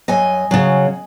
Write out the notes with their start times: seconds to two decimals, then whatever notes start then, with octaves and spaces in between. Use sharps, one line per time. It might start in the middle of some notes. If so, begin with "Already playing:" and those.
0.08 F#2 D#5 G#5
0.51 C#3 F#3